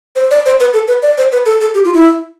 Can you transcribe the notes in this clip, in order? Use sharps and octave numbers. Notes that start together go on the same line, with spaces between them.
C5
D5
C5
B4
A4
B4
D5
C5
B4
A4
A4
G4
F4
E4